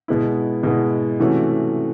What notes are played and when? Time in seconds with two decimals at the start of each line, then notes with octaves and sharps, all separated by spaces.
0.08 B2 G#3 B3 E4
0.63 B2 G#3 B3 E4
1.19 C3 E3 A3 C#4 F#4